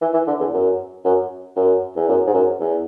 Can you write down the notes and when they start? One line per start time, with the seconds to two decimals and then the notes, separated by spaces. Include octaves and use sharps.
0.02 E3
0.13 E3
0.27 D3
0.40 E2
0.53 F#2
1.05 F#2
1.56 F#2
1.96 E2
2.09 F#2
2.27 G#2
2.34 F#2
2.60 E2